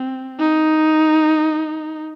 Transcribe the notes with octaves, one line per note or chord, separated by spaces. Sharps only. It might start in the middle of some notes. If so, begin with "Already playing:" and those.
Already playing: C4
D#4